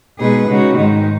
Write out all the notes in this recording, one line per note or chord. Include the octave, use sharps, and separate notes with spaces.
B2 G#3 D#4 G#4 B4
C#3 G#3 D#4 F#4
G#2 D#3 G#3 D#4